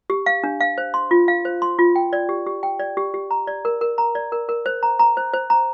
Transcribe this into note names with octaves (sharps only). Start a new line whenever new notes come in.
G4
F5
D4
F5
C5
C6
F4
F5
C5
C6
F4
G5
D5
G4
G4
G5
D5
G4
G4
A#5
D5
A#4
A#4
A#5
D5
A#4
A#4
C5
A#5
A#5
C5
C5
A#5